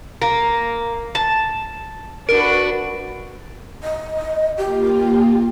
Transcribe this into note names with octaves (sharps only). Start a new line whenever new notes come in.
A#3
A5
D4 F#4 A#4 B4 D7
D#5
A#3 F4 G4